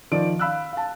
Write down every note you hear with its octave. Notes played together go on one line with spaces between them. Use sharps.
D#3 F3 D5 D7
F5 B5 E6 F#6
F5 A5